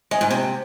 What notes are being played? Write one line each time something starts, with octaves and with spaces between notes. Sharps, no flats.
G#3
G#2
C3